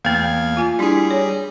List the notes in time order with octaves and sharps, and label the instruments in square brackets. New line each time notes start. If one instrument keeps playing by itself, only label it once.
[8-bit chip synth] E2 F5 G#6 [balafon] A3 A#3
[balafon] F4 G#5
[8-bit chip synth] G3 G#4 [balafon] D4 E4
[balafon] C#5